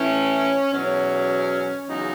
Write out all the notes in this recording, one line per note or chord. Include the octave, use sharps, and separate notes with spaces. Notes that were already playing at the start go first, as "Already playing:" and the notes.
Already playing: A2 E3 C#4
E2 B2 F#3 C#4
E2 C#3 F#3 D#4